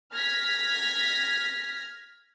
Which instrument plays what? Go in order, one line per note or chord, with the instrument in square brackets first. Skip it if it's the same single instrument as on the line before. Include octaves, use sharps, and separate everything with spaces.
[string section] F6 G#6 A#6 B6